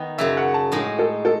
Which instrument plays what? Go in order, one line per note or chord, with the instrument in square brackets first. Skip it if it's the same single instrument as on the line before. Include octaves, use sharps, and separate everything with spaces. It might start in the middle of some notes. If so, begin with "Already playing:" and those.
Already playing: [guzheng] D#3 B3 D#4
[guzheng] F#2 C#3 F#3 [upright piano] E5
[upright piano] F#5
A5
[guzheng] A2 G#3 D#4
[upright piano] A4
A4